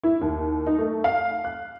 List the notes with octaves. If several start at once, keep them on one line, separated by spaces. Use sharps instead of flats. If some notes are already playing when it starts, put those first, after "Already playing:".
E4
D#2
D#4
A3
F5
F#6